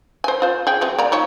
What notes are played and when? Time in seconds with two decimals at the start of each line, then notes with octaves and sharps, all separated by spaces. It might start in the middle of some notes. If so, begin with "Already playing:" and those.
0.24 C5 G#5
0.42 F4 C5
0.67 G#4 G5
0.81 F#3 C4 G#4
0.98 A#3 D5 A#5
1.12 F3 D#4 C#5